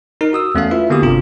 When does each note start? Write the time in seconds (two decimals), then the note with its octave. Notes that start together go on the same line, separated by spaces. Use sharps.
0.21 D#4 A#4
0.33 F#4 D#6 E6
0.55 E2 A3 C#4 A4 F5
0.71 E4 F4 B4 E5
0.90 D3 A#3 B3 F#4 G4 D#6
1.02 G1 C3 D4 F4